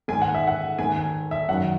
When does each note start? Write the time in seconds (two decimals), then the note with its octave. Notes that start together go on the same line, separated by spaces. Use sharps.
0.08 G#2 D#3 G#5
0.22 F#5
0.34 E5
0.47 F#5
0.79 G#2 D#3 G#5
0.96 G#5
1.31 E5
1.49 F#2 F#5
1.51 D#3